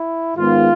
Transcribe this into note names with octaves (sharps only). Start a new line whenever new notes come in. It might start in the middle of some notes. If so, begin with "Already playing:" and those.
Already playing: E4
G#2 D#3 G#3 B3 F4